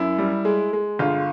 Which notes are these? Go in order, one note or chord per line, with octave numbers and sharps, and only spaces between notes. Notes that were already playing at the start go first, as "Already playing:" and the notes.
Already playing: F#2 E4
G3
G#3
G#3
G1 F4